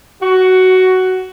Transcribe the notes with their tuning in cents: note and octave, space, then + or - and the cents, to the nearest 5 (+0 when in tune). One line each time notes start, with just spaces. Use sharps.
F#4 +10